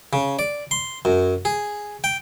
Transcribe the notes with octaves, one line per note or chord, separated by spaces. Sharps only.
C#3
D5
C6
F#2
G#4
G5